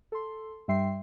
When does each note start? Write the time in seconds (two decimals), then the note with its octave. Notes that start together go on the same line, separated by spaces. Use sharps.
0.12 A4 C6
0.68 G2 G3 E5 G5 C6 C7